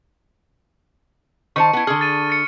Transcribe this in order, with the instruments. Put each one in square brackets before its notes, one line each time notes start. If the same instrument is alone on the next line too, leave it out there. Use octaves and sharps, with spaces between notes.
[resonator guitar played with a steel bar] D#3 C5 A5 [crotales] C#6 C#7
[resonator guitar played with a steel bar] B3 E4
[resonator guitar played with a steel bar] D3 G#4 [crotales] F6
[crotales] A6 D#7
A6 C#7